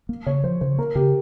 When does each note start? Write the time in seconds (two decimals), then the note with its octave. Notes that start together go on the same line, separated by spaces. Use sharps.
0.09 A#3
0.26 C#3 C#5
0.44 F3 C5
0.61 C#3 C5
0.78 A#3 A#4
0.95 C#3 G4